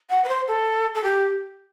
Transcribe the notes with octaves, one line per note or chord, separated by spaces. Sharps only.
F#5
B4
C5
A4
A4
G4